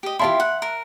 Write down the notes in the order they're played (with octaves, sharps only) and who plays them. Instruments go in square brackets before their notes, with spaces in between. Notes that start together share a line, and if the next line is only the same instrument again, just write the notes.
[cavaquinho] G4 D#5
[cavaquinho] E4 F4 G4 [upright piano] E5 A5 C6
[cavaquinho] F#5
A#4